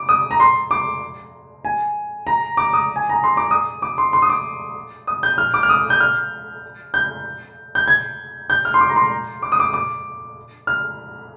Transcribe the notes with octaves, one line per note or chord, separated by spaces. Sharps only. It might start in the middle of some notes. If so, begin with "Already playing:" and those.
Already playing: D6
D#6
A#5
C6
D6
G#5
A#5
D6
D#6
G#5
A#5
C6
D6
D#6
D6
C6
C6
D#6
D6
D#6
G6
F6
D6
F6
D#6
G6
F6
G6
G6
G#6
G6
F6
C6
D6
A#5
C6
D6
D#6
D6
D6
F6